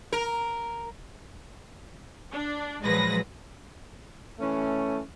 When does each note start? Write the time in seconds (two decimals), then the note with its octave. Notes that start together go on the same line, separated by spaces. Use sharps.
0.12 A#4
2.32 D4
2.83 A#2 F3 F#3 G#3 B4 A#6
4.40 E3 A3 C#4